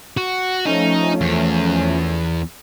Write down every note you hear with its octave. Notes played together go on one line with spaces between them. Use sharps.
F#4
F3 A3 C#4 D#4
E2